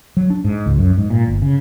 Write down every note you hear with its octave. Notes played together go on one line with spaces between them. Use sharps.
F#3
D4
G#2
C#2
F#2
G#2
A#2
G1
C#3